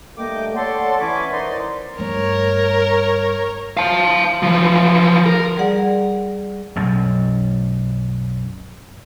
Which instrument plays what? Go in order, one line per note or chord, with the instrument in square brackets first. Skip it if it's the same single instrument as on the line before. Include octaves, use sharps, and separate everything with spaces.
[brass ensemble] G2 G3 A#3 [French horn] A3 [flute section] D#5 G5 D6
[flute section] A4 D5 C6 [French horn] C#5 [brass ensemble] F#5
[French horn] E3 [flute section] C#4 B5 D6
[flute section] D#4 D5 C6 [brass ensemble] A#4 C5
[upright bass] G2 A3 [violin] A#4 C#5
[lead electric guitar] F5 A5
E3 F3
A#4
[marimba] G3 G#4 D5 F#5
[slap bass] B1 F#2